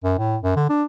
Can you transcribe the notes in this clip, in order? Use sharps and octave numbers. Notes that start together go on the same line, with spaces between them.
F#2
A2
F#2
D3
D4